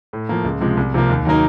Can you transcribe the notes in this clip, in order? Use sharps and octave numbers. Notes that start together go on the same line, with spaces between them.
A2
F3 A#3
C#2
C3 F3 G#3
C2
C3 F3 A#3
D#2
D#3 F#3 A#3 D#4